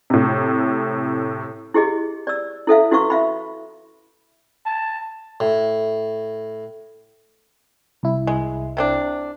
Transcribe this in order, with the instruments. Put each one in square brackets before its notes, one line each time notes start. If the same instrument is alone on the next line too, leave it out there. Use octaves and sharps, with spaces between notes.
[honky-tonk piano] A2 C3
[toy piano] E4 G4 G#4 D#5
D5 E6
E4 A4 E5 F5
E4 F#4 B4 F5 C#6
E5 F5 B5
[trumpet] A5
[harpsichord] A2
[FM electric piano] C2 E4
[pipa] G#3
C3 C4 D4